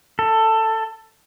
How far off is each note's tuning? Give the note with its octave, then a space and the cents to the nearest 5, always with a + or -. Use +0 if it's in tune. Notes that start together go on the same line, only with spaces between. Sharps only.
A4 +15